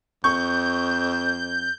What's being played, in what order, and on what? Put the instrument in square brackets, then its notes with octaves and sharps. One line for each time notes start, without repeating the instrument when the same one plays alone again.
[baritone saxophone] F2 [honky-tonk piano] C#6 [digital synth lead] G6